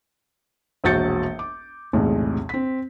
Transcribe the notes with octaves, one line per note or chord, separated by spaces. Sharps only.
E1 A#1 F#4 G6 A6 C#7
D6
B1 E2 A2 C3 G#3
C4 B6